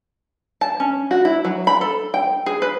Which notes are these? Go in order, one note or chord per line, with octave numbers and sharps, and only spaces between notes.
A5
C#4
F#4
E4
F#3
B5
A4
G5
G#4
B4